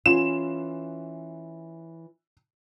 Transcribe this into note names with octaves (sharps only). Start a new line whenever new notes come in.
E3 C#4 F4 E7